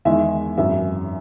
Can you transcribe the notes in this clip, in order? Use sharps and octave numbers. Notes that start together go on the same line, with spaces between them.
E2 D#3 G#3 E5
G#1 F#2 E3 E5